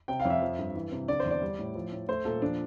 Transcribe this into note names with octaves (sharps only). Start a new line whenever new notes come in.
C3 G5
F5
F2
E5
F3
G2
E3
C3
D3 D5
C5
E2
D5
G3
A2
F3
A2
A3 C5
A#2 A4
F3 D4